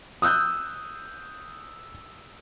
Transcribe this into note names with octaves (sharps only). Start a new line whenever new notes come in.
D#6 E6 F#6 G6